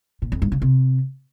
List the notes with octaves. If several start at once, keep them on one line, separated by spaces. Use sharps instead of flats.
A#2
F2
G2
C#3
C3